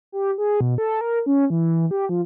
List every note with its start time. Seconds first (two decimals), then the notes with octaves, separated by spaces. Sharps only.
0.12 G4
0.38 G#4
0.61 B2
0.78 A4
1.01 A#4
1.26 C#4
1.50 E3
1.91 G4
2.09 F3